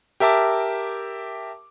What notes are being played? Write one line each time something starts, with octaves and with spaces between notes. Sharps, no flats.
G4 A#4 E5 A5 D6